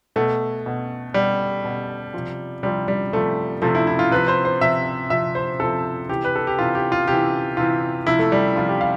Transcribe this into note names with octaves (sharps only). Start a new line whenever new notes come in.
B2 A3
B2
B2 G3
B2
C3 F3
C3 F3 G3
G3
C3 F3 A3
C3 F3 A3
E4
E4
F4
C3 F3 B4
C5
C5
C3 F3 E5
C3 F3 E5
C5
C3 F3 A4
C3 E3 G4
B4
A4
G4
C3 E3 F4
G4
F4
C3 E3 G4
C3 E3 F4
C3 F3 E4
A3
G3
C3 F3 F4
G4
F5